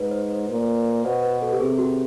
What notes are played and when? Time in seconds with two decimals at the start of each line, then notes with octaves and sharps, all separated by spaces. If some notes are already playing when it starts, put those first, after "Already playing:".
Already playing: G#2 B4
0.11 C5
0.31 C5
0.48 A#2
1.04 B2 C5
1.23 B4
1.42 A4
1.52 G4
1.60 C3 G#4
1.78 F#4